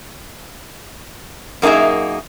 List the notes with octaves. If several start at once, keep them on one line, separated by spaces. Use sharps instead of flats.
F#2 A#3 D#4 G#4 E5